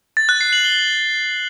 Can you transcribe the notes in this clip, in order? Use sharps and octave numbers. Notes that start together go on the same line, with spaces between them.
A6
F#6
C7
F#7
G7